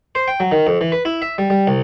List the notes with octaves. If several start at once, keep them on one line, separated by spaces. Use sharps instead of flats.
C5
G5
F#3
D#3
F2
E3
B4
E4
E5
G3
G3
C2